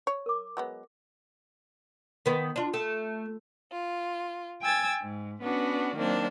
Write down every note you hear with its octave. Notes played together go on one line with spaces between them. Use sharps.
C#5
A#4 D6
F#3 G#3 B3
D#3 B3
D4 F4
A3
F4
G5 G#5 E6 G#6 A6
G#2
B3 C#4 D4 F#4
D#3 F#3 A#3 C4 D4